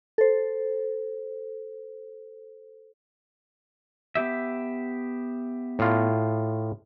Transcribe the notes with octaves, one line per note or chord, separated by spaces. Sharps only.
A4 C5
B3 G4 E5
A2 F4